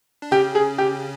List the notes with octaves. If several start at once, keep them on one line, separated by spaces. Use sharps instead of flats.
D4
C#3 C#4 G4
G#4
G4